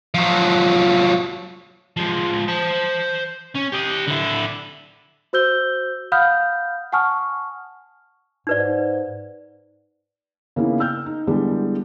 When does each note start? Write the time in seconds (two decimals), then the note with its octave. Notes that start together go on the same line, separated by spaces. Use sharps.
0.14 F3 F#3
1.97 F3 G#3
2.48 C5 A5
3.55 C#4
3.72 G4 D#5
4.07 D3 E4
5.33 F#4 C5 E6 G6 G7
6.12 F5 F#5 B5 D#6 F6 G6
6.92 F#5 G#5 A5 C#6 D#6 F6
8.47 G#2 D#4 B4 D5
10.56 C#3 A#3 B3 D#4 E4
10.79 G5 E6 F6 G6
11.06 D#4
11.27 D3 E3 G3 G#3 B3